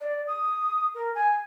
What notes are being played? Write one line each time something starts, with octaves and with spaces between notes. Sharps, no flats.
D5
D#6
A#4
G#5